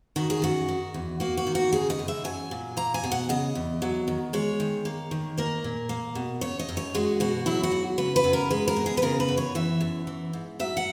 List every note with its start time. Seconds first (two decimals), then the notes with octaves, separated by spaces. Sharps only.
0.16 D#3 F#4
0.30 G#4
0.42 F#2 F#4
0.68 D#3
0.94 E2
1.20 A#3 F#4
1.37 F#4
1.47 D#3
1.55 F#4
1.72 C#3 G#4
1.90 D#5
1.99 F#2
2.08 E5
2.24 F#3 G#5
2.51 A#2
2.77 A#3 A#5
2.94 G#5
3.04 B2
3.12 F#5
3.29 C#3 D#5
3.55 E2
3.82 F#3
4.08 D#3
4.33 G#3 C#5
4.60 D#3
4.85 A#3
5.11 D#3
5.38 A#3 A#4
5.64 A#2
5.89 A#3
6.15 B2
6.41 C#3 C#5
6.59 D#5
6.69 F#2
6.77 C#5
6.95 G#3 F#4
7.20 B2 F#4
7.46 F#3 E4
7.63 F#4
7.72 G#2
7.98 C#3 B4
8.16 B4
8.24 F#2
8.33 A#4
8.51 G#3 B4
8.68 A#4
8.76 B2
8.86 G#4
8.97 B4
9.02 C#3 A#4
9.20 B4
9.28 F#2
9.37 C#5
9.55 E3 E5
9.81 F#2
10.07 E3
10.33 G#2
10.60 F#3 E5
10.77 F#5